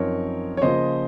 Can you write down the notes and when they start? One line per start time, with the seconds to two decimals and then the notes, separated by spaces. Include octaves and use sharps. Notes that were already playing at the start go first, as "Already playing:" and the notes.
Already playing: F#2 F3 C4 D#4 A#4 C#5
0.57 C#5
0.62 C#3 F3 A#3 F4 C5 D#5